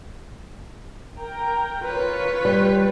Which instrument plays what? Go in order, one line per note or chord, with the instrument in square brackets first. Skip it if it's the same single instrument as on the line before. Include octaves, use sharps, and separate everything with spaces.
[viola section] A#4 G5 A#5
[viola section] F4 C#5 [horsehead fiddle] B4
[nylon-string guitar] G3